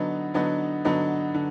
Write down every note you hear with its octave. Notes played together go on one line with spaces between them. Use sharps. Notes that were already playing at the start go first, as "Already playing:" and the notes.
Already playing: D3 F#3 B3 D#4
D3 F#3 B3 D#4
D3 F#3 B3 D#4
D3